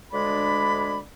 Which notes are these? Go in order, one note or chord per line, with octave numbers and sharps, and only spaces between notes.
D2 G#3 D4 D5 B5